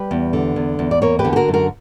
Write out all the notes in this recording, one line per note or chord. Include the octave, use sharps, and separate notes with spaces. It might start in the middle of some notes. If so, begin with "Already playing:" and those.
Already playing: G3 G4 B4
E2
D3
E2
E2
D5
A#3 A#4 C#5
G4 B4
D3
G4
F#4 A#4
F#2
F#4 A#4